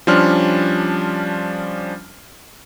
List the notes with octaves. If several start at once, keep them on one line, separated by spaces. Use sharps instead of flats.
F3 G3 C#4 D4 C6 F6